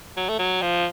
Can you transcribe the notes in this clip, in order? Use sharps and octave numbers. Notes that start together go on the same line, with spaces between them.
F#3
A3
F#3
F3